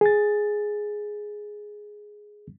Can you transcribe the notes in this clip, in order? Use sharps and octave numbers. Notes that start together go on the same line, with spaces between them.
G#4 A6